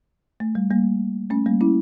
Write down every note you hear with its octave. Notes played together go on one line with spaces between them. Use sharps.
A3
G3
G3 A#3
A3 C#4
G3 A#3
C#4 E4